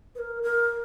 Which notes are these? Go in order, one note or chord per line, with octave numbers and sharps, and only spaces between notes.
B4
A#4
A#4